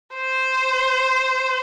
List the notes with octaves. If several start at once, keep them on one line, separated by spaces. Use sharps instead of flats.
C5